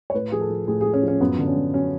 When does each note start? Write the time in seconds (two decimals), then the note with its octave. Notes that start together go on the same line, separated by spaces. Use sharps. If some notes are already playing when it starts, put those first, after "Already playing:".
0.10 C#5
0.14 A2 B4
0.32 F3 G#4
0.41 A4
0.50 F3
0.68 A2 G#4
0.81 G#4
0.85 A2
0.94 C#4
1.03 F3
1.08 C#4
1.21 F#2 B3
1.39 D3
1.47 C#4
1.56 F#2
1.74 F#3 C#4